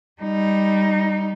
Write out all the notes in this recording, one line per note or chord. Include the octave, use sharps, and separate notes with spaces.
G3 D#4